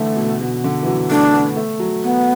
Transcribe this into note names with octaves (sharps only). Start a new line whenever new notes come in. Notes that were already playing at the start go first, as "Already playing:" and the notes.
Already playing: D3 E3 A3
B2
B2
D3
E3
F#3
A3 D4
B3
A3
F#3
B3